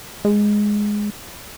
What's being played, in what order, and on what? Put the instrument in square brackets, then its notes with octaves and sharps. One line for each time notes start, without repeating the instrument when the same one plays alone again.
[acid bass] G#3